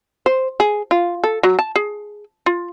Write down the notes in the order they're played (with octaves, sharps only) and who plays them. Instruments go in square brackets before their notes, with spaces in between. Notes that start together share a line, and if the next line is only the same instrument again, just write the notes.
[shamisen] C5
G#4
F4
A4
F#3
A5
G#4
F4